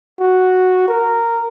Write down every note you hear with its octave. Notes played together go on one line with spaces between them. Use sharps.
F#4
A#4